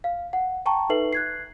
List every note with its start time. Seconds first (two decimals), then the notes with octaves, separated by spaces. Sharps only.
0.04 F5
0.33 F#5
0.66 G5 A5 A#5 C#6
0.89 D#4 A4 B4 E5 C7 F#7
1.13 F#6 G#6 C7